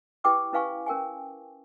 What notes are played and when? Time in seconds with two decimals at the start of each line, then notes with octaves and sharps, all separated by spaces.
0.24 E4 G4 B4 G5 D6 D#6
0.53 C#4 E4 B4 F5 G#5 C#6
0.86 C#4 A#4 G5 G#5